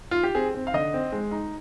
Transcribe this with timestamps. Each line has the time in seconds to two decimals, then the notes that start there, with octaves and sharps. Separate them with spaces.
0.11 F4
0.23 G4
0.35 C4 G#4
0.55 C4
0.67 F5
0.74 D3 D#5
0.94 C4
1.12 G#3
1.31 D#4